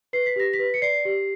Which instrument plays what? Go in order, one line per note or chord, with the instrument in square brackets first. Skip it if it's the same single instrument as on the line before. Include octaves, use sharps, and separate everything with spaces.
[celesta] B4 C7
B6
G4 A#6
B6
B4
C#7
D5 C7
G4